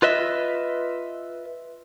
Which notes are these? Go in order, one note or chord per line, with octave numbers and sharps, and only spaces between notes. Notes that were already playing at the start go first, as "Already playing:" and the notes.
F4 B4 D#5 E5